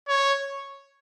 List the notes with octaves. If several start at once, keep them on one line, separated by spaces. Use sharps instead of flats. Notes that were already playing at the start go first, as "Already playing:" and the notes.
C#5